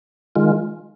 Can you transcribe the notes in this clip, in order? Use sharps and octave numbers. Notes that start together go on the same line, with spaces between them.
D#3 G#3 F4